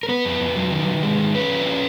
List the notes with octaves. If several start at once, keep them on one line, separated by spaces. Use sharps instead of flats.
A#4
B3 B4
F2
F2
F#3
D#3
D#3
G#3
D#3
C#4 B4
F3
C#4